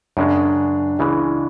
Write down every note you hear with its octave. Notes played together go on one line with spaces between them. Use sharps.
F#2 C#3 G#3 D4
C#2 C#3 E3 G#3 E4